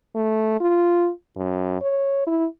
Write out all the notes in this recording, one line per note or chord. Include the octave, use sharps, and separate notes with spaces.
A3
F4
F#2
C#5
E4